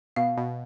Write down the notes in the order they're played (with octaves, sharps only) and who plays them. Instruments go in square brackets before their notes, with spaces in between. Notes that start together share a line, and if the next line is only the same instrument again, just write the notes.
[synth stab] B2 [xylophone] F5
[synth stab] B2